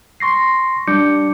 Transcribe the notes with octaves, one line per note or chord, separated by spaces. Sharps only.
C6 C#6 A#6 C7
G3 D4 D6 G6 C#7